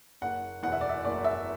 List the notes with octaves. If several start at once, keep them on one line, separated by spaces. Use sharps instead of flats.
F#1 F#5
E2 B2 F#5
E5
D5
E5
F#1 D5
E5